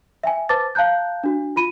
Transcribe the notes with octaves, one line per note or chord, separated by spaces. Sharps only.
E5 G5 G#5
B4 C5 A5 D6 A6
F5 A5 A#5 F#6 G6
D4 F#4
F4 B5 D#7